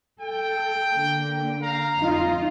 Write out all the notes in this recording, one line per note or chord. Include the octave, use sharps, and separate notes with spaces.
A4 G5
D3 A#3
F5 A#5
F2 D#4 F4